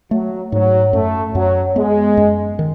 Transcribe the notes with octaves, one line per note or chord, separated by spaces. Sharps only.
F#3 A3
G#2 F#3
F#2 A3
F#2 F#3
G#3 B3
F#2
D#3